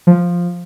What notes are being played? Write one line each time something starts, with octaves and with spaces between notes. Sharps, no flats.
F3